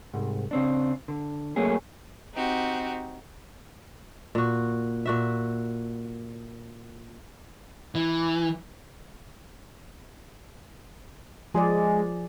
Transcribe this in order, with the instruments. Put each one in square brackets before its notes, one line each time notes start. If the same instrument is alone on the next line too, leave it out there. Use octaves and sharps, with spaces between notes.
[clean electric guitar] C2 G#2
C#3 C4 D4
D3
F#3 A3 A#3 C#4 G#4
[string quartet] C4 D#4 F#4 G4
[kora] A#2 F#4
A#2 F#4 E5
[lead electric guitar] E3
[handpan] F3 G#4 D5 [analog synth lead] G#3